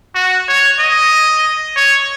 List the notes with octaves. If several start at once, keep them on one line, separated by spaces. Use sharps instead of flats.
F#4
C#5
D#5
C#5